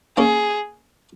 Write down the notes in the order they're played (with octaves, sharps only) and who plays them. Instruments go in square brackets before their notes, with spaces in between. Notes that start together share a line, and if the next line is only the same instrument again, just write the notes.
[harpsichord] A#3 C#4 [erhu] G#4